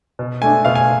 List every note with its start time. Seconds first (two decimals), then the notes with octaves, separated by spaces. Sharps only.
0.19 B2
0.42 A3 D4 G#5
0.65 B2 F5
0.75 G#5